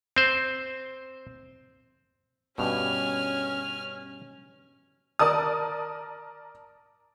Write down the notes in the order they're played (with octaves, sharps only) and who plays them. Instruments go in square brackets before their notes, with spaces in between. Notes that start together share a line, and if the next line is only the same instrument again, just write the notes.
[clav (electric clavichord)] C4 C5
[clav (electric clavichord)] G2 B2 [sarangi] C#4 [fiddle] G#5 F6
[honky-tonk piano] A#4 D5 A5 D#6